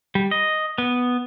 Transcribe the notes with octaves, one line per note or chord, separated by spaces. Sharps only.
G3
D#5
B3